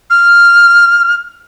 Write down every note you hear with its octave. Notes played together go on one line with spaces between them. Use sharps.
F6